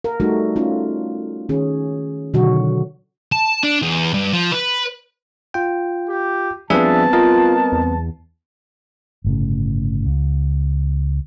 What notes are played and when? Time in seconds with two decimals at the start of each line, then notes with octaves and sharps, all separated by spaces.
0.04 A#4
0.20 G3 A3 D#4 F#4 A4
0.56 C#4 D#4 F4
1.49 D#3 C#4 G#4
2.34 B2 D3 D#3 F#3 F#4
3.32 A5
3.64 D4
3.82 E2
4.14 G2
4.33 F3
4.52 B4
5.54 F4 G5
6.09 G4
6.70 F3 G3 B3 C4 D4 G#4 E5 A5
7.13 F4 A#4 D#5
7.72 E2
9.25 G1 A2 C#3
10.05 C#2